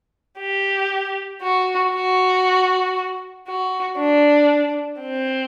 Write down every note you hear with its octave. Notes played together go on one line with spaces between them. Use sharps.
G4
F#4
F#4
F#4
D4
C4